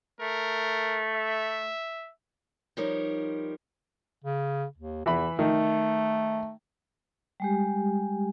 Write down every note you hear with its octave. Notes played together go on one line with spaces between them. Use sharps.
A3 A#4
E5
F3 G3 D#4 A#4 C#5
C#3
D#2
E2 E3 E5 B5
D#3 A3
G3 G#3 G4